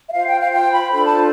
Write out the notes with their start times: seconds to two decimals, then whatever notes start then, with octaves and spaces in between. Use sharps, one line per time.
0.09 E5
0.13 F4 C5 F5
0.27 G5
0.39 F5
0.52 G5
0.72 B5
0.92 D4 F4 A4 C5 B5
1.06 A5